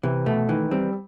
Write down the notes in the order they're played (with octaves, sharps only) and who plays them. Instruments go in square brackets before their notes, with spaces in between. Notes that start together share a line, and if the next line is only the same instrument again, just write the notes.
[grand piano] C3 [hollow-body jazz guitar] E3
[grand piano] B2 [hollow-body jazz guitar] A3
[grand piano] D#3 [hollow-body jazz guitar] E3
[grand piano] G3 [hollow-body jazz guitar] C4